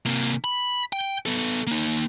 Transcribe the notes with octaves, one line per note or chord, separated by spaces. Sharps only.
C3 A#3
B5
G5
B3 A4
A#3 D#4